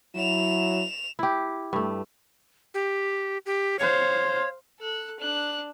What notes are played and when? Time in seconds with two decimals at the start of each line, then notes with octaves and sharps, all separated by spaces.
0.16 F#3 E4 E7 F7
1.19 E4 G4
1.73 G2 A3
2.74 G4
3.46 G4
3.79 C5 C#5 F5
4.80 A4 F#6
5.20 D4 F#6